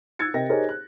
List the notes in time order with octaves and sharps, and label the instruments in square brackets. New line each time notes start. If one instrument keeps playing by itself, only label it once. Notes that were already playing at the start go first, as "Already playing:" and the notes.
[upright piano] E6 F#6 G#6 A6 C#7
C3 A#4 D#5 G5 A#6
D#4 G4 G#4 A#4 C5 C#5
F#6